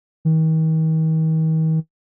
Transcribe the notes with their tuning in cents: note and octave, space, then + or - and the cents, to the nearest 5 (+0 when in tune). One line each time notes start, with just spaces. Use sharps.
D#3 +40